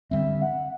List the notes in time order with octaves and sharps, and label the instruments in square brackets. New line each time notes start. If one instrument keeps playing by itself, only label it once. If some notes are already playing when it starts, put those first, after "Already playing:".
[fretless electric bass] D3 G3 C4 [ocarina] E5
[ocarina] F#5